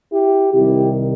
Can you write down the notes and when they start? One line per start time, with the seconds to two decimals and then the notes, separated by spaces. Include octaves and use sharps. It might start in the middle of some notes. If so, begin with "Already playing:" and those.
0.12 E4 G4
0.53 C2 C3 D#3 E4 G4